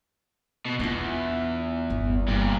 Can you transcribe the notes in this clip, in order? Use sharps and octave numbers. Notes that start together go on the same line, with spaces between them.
B2
E2 D4 F4
G1
G2 A#2